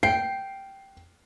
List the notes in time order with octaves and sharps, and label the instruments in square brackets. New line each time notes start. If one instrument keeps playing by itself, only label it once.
[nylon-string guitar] G5 [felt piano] C7